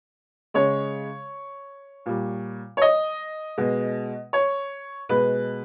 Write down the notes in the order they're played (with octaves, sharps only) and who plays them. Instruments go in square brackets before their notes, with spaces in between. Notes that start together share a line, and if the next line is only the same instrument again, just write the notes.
[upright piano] C#3 G#3 C#5
A#2 G3
C#5
D#5
B2 G#3
C#5
B2 G#3 B4